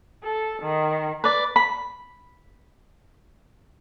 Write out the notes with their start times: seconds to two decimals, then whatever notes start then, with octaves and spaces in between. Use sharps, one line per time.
0.23 A4
0.62 D#3
1.24 B4 D5
1.56 B5